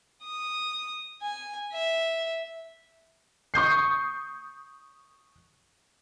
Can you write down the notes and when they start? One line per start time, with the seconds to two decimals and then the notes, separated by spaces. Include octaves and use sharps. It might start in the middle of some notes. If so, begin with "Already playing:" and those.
0.23 D#6
1.22 G#5
1.73 E5
3.54 C#6 D#6 G6 C7